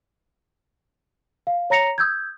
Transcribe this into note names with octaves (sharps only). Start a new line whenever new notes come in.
F5
C#5 A#5 A#6 C#7 F7
D#6 E6 G6 G#6